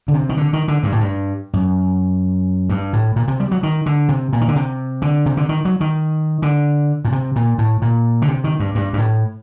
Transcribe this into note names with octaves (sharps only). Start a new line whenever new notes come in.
D3
C3
D#3
D3
D#3
D3
G2
A2
G2
F#2
G2
A2
A#2
C3
G3
F#3
D#3
D3
C3
A#2
D#3
D3
C3
D3
C3
D3
D#3
F#3
D#3
D3
A#2
C3
A#2
A2
A#2
D3
C3
D#3
G2
G2
G2
A2